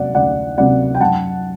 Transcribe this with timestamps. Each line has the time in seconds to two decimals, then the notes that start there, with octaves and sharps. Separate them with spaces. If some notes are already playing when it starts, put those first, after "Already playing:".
Already playing: C3 F#3 A#3 D5 F#5
0.14 D2 D5 F#5
0.58 C3 F#3 A#3 D5 F#5
0.95 G5
1.00 F#2 F#5 A5